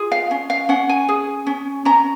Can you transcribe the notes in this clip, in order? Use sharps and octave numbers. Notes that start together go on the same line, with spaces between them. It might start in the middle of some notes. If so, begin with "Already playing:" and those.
Already playing: F4 G#4
F5
C#4
F5
C#4 F#5
G#5
G#4
C#4
C#4 A#5